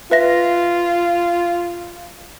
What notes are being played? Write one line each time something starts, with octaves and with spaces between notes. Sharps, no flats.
F4 B4 E5 A#6